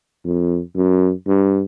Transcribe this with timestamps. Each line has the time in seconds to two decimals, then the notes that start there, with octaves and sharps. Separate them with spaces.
0.25 F2
0.76 F#2
1.27 G2